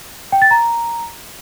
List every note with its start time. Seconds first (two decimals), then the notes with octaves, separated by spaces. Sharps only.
0.32 G5
0.42 A6
0.51 A#5